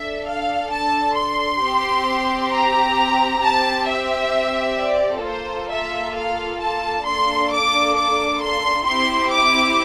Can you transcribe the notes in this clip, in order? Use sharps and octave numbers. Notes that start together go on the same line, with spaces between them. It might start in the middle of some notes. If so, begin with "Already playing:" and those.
Already playing: D4 A4 E5
F5
A5
C6
C4 G4
A#5
C4 G4 A5
E5
D5
A#3 F4 A4 C5
E5
F5
A5
A#3 D4 A4 C6
D6
D6
C6
C4 E4 G4 C6
D6